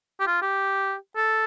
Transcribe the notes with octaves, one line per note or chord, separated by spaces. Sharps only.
G4
F4
G4
A4